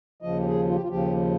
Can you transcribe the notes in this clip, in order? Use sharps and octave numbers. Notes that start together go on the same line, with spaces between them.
D#2 C#3 F3 D#5
G4
G#4
F4
G4
F4
D#2 C#3 F3 G4